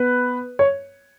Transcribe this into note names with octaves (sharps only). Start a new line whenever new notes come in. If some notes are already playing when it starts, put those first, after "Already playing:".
Already playing: B3 B4
C#5